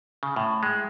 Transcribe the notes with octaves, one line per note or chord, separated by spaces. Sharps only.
C#3
A2
G#3